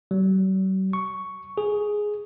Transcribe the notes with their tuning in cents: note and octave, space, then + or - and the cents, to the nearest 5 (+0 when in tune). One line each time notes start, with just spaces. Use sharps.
F#3 +45
C#6 +5
G#4 +5